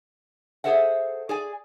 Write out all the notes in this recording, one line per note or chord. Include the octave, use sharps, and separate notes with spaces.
G#4 A4 C5 E5 F#5
G#4 D5 G#5